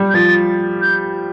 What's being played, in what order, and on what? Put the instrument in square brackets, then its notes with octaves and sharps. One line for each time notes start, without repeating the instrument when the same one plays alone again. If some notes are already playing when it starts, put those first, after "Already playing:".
Already playing: [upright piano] G3
[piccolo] G6
[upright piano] F3 [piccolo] A6
[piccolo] G6